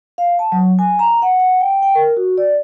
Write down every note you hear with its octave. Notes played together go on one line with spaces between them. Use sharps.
F5
A5
F#3
G#5
A#5
F#5
F#5
G5
G5
A#4
F#4
D5